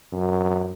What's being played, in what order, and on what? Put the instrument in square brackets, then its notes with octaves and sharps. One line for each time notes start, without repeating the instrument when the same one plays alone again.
[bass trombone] F#2